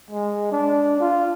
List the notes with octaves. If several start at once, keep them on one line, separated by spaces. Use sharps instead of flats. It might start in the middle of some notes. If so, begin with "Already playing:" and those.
G#3
D4
F4